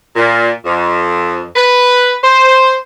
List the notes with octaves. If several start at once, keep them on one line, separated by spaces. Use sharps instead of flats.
A#2
F2
B4
C5